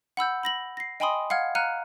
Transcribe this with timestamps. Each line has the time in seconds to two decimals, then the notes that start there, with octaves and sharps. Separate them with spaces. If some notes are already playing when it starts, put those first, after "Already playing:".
0.17 F#5 B5 E6 G6
0.43 B5 A#6 F#7
0.77 A#6 C7
1.00 D#5 G5 G#5 B5 C6 D#6
1.30 F5 F#5 F6 G#6
1.55 F5 A#5 F6 F#6 C#7 D#7